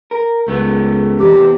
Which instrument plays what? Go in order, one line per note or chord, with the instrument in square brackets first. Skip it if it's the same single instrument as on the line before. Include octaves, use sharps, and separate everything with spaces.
[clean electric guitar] A#4
[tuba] C#2 [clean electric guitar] A3 B3
[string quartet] E2 C3 C4 [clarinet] G4